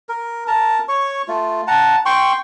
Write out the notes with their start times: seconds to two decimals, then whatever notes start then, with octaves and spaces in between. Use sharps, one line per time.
0.09 A#4
0.47 A#4 A5 A#5
0.88 C#5 C#6
1.28 A3 F4
1.67 F#5 A5 A#5
2.06 G5 C6 C#6